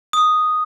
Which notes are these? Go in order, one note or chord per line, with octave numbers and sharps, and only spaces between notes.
D#6